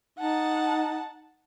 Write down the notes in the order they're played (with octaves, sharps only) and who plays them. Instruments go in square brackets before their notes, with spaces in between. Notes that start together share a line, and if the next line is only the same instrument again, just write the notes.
[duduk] D#4 [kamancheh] F#5 A5